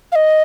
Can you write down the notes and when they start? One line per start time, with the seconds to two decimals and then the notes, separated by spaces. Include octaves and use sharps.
0.12 F5
0.15 D#5